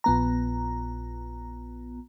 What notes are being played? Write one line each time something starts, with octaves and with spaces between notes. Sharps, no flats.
A#1 B3 A#5